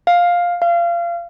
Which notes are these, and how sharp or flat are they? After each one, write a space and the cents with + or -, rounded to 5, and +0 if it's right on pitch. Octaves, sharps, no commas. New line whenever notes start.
F5 +10
F5 -25